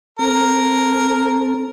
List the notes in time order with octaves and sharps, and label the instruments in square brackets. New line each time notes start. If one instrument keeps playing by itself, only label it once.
[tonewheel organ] C4 A4 [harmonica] A#4